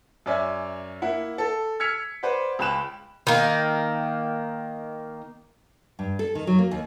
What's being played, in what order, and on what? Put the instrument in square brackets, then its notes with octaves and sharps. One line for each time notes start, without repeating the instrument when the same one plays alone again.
[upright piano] F#2 C#4 D5 E5 G#5
A#3 E4 F#5
A4
E6 F6 G#6 B6 C#7 F7
B4 C5 D5 F#5
C#2 G5 B5 F#6 E7
[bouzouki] D#3 A#3
[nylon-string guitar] G2
A4
D#3
F#3
A#3
D#2